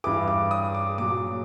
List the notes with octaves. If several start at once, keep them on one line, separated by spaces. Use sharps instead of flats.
G2 E3 D6
D6
D#6
D6
A#2 F#3 D6